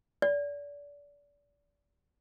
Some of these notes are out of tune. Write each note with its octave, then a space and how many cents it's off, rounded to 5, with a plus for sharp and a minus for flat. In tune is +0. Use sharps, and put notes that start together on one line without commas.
D5 -30